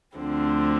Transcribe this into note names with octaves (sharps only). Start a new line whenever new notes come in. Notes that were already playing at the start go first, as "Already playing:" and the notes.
D2 D3 F3 C4